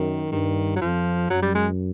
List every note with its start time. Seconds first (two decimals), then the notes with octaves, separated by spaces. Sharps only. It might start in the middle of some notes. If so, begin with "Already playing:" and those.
Already playing: F#2 D#3
0.32 G2 D#3
0.76 F#3
0.81 F2 F3
1.30 F#2 F#3
1.42 G3
1.55 G#3